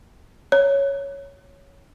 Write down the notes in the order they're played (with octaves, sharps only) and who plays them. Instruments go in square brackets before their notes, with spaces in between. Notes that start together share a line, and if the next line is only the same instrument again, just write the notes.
[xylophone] C#5